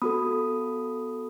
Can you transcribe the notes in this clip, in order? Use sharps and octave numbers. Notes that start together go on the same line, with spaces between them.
B3 F#4 A4 B5 D#6